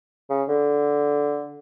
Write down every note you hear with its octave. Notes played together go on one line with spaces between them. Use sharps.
C#3
D3